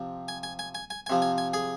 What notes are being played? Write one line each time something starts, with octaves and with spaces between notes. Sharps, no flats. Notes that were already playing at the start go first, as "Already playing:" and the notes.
Already playing: C3 F3
G#5
G#5
G#5
G#5
G#5
G#5
C3 F3
G#5
G#5
G#4 G#5